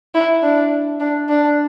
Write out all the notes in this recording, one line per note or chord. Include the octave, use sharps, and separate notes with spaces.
E4
D4
D4
D4